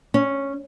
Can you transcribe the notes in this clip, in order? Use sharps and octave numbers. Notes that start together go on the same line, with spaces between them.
C#4